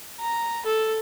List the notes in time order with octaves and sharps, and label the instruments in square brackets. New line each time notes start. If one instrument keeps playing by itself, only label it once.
[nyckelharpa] A#5
A4